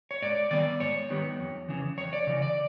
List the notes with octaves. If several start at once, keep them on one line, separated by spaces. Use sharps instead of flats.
C#5
G#2 D5
D#3 G3 B3 D5
G#2 C#5
D#3 G3 B3
F2
C#3 E3
F2 C#5
D5
C#3 E3
D5